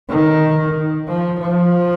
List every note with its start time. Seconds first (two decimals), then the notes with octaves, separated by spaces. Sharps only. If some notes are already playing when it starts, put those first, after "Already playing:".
0.09 D#3
1.07 F3
1.40 F3